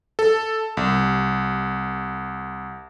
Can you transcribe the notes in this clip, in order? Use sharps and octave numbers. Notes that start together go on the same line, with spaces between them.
A4
C2